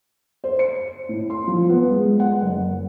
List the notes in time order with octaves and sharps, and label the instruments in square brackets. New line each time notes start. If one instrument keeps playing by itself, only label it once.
[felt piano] C5
C#7
A2
C6
F3
B3
G#3
F#5
F#1